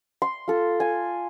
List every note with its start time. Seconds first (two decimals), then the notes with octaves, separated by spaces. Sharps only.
0.22 C6
0.48 F4 A4
0.80 G#5